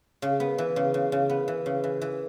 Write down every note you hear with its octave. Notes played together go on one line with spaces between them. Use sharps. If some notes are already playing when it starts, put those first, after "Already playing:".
C#3
B3
E3
C#3
C#3
C#3
B3
E3
C#3
E3
E3